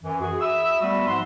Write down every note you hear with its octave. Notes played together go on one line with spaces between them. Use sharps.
F#2 E3
F#4 G#4
E5 B5 D#6 E6
G3 A3 B3 F#4 B5 E6
G#2 F3 F#5 C6